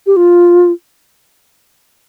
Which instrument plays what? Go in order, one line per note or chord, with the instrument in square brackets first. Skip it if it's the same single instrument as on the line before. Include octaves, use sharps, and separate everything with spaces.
[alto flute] G4
F4